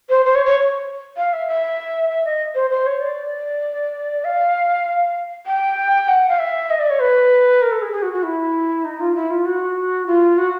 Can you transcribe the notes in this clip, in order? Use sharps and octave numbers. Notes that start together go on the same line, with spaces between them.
C5
C5
C#5
C#5
F5
E5
E5
E5
D#5
C5
C5
C#5
D5
F5
G5
F#5
F5
E5
D#5
D5
C#5
B4
A#4
A4
G#4
G#4
F#4
F#4
E4
D#4
F4
E4
F4
F#4
F4
F#4